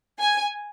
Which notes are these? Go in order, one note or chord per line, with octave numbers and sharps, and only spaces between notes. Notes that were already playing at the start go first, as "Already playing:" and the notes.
G#5